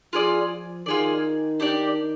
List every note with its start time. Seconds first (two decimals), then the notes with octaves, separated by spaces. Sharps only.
0.13 F3 F4 G#4 D5
0.86 D#3 F4 G#4 D5
1.60 D4 G4 D5